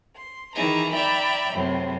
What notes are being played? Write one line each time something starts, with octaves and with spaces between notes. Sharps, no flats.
C6
D#3 E3 D#4 E4 G#4 A#5
D5 E5 G5 A#5 B5
F#2 A2 C3